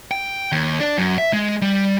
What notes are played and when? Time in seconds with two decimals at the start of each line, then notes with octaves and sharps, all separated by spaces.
0.11 G5
0.52 D#2
0.80 D4
0.98 F#2
1.18 E5
1.33 G#3
1.62 G3